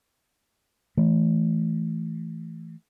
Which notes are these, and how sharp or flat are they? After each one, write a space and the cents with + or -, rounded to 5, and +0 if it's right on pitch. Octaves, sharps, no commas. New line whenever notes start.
E3 +0 A3 +0